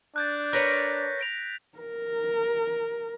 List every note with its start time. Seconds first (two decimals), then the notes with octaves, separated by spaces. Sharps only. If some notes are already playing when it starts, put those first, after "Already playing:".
0.16 D4 F#6 G6 A6
0.53 A#4 B4 C#5 F#6 A#6 B6
1.19 A#6 D7 F7
1.79 A#4